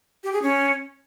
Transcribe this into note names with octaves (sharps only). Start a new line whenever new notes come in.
G4
G#4
C#4